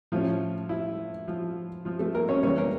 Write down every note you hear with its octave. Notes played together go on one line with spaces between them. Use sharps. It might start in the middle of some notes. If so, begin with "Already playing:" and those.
A2 F3 C#4 F4
E4
F3 F4
F3 F4
A3 A4
A#3 A#4
C#4 C#5
C#3 E3 G3 A#3 C#4 C#5
A#3 A#4